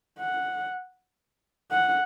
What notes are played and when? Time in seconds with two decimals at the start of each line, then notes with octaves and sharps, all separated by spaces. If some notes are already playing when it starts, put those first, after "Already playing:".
0.20 F#5
1.72 F#5